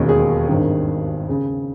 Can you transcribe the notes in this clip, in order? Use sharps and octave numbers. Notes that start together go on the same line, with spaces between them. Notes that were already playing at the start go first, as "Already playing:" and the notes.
Already playing: E1 D#2 D#3 G#3 C#4
G#4
G#1 G2 D#3
C#3